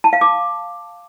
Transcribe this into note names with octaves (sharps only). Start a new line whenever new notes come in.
A5
F5
D6